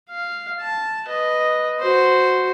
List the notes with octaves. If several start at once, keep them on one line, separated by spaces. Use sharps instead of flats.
F5
A5
B4 D#5
F#4 C5